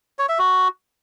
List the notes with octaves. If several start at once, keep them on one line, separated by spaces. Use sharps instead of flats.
C#5
E5
F#4